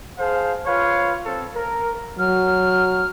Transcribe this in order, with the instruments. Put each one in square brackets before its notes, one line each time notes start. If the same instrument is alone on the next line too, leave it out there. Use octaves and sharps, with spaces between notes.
[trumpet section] G#4 C5 F5 A5
F4 B4 C#5 F5
C4 A4
A#4
[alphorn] F#3 [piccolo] F6